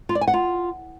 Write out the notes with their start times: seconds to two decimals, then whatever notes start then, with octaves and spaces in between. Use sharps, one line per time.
0.09 F4
0.15 D5
0.21 G#5
0.28 F#5
0.34 F4